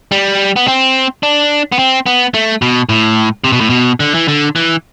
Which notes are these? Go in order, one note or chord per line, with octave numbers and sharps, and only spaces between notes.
G3
B3
C4
D4
B3
C4
B3
A3
B2
A2
C3
B2
A2
B2
D3
E3
D3
E3